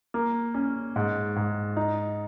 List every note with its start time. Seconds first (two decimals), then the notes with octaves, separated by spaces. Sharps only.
0.14 A#3
0.54 C#4
0.96 G#2
1.36 G#2
1.77 D#4